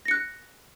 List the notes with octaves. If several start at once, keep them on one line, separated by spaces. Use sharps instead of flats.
F#6 A#6 C#7